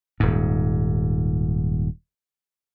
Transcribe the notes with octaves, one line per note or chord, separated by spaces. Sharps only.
D#1 G#2